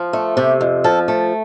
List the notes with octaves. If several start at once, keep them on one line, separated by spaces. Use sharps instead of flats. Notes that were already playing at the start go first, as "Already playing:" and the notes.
Already playing: F3
A3
C3 G4
F2
F3 A4
A3